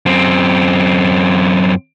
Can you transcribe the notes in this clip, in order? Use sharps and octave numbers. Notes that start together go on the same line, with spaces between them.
F#2 C4